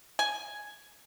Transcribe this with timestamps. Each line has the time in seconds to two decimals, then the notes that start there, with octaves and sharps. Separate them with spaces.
0.19 G#5